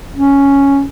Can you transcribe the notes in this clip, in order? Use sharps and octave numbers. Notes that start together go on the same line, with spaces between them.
C#4